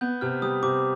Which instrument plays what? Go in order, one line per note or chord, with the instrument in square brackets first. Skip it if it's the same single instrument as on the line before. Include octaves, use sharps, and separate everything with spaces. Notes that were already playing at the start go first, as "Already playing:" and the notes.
[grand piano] B3 [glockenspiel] G6
[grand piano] C3 [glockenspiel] F6
[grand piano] G3 [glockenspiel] D#6
[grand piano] C3 [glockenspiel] D6